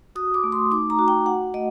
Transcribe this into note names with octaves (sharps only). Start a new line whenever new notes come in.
F#4 D#6
D6
A3
C6
D#4 D6
A#5
F#4
G5
F#4 F#5
A3 D#5